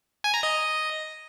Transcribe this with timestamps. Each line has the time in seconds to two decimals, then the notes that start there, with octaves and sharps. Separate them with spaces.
0.24 G#5
0.34 A#5
0.43 D#5